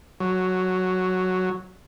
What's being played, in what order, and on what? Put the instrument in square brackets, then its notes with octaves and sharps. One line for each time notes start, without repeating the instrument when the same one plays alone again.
[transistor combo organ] F#3